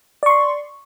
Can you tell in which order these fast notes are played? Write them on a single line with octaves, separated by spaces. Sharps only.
D5 C#6 C6